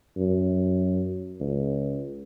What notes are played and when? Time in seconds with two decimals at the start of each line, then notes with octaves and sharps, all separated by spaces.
0.17 F#2
1.40 C#2